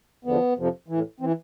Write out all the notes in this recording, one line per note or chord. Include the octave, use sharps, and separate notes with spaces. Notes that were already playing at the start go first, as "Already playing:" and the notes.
E2 D3 F3 B3
F2 C3 F3
A2 E3
E3 C4